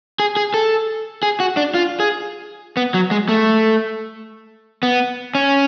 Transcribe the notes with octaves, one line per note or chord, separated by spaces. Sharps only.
G#4
G#4
A4
G#4
F#4
D4
F4
G#4
B3
F#3
G#3
A3
B3
C#4